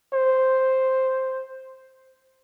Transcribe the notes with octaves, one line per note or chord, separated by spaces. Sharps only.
C5